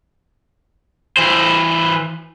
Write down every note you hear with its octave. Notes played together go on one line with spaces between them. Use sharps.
E3 C5